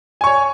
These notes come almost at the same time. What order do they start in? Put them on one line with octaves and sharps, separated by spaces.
G#5 C#6 C#5